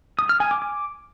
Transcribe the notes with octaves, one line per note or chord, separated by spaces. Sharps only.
D#6
F6
G#5
D6
D6